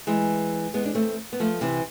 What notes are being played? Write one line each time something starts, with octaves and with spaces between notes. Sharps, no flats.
E3 G#3
G#3 B3
D4
A3 C4
B3
F3 A3
C3 E3